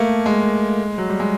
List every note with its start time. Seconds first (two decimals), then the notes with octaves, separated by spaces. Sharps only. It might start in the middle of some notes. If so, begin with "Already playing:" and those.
Already playing: A3 A#3
0.26 G#3
0.98 F#3
1.10 G3
1.20 G#3